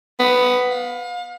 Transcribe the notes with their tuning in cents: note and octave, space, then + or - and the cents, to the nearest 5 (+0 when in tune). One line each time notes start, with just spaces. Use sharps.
B3 +10
F5 +35